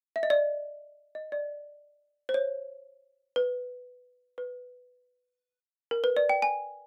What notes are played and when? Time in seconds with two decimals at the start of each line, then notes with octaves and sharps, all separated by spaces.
0.16 E5
0.23 D#5
0.30 D5
1.15 D#5
1.32 D5
2.29 C5
2.34 C#5
3.36 B4
4.38 B4
5.91 A#4
6.04 B4
6.17 D5
6.29 G5
6.42 G#5